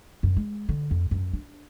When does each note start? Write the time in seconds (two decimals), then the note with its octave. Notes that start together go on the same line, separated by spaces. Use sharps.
0.23 F#2
0.37 G#3
0.69 D3
0.91 F2
1.11 F#2
1.33 D4